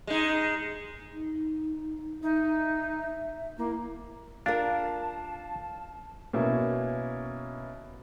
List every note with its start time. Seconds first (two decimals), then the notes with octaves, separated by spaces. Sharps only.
0.07 G#3 D#4
1.14 D#4
2.23 D#4 E5
3.58 A#3 E4
4.46 D4 F4 A#4 F5 A5
6.33 B2 A#3 C#4 E4